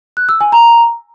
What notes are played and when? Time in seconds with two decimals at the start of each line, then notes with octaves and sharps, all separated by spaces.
0.17 F#6
0.29 E6
0.41 G#5
0.52 A#5